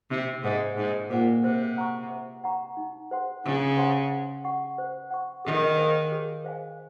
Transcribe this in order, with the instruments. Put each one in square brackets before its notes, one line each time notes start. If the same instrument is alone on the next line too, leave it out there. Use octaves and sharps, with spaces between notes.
[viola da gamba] C3 [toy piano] D#4
[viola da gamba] G#2 [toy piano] G#4 C5 F#5
[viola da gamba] G#2 [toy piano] D#4
[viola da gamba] A#2 [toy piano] G#4 C5 F#5
[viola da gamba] C3 [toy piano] C5
[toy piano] F#5 A#5 C#6
C5
F#5 A#5 C#6
D#4
G#4 C5 F#5 C6
[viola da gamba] C#3 [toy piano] D#4
[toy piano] G#4 C5 F#5 C6
C5
F#5 C#6
C5
F#5 C#6
[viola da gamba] D#3 [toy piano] G#4
[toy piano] C5 F5 G#5
G#4
C5 F5 G#5